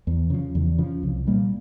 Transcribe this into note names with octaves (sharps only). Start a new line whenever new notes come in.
E2
C#3 F3
E2
C#3 F3
C2
A#2 G3 A#3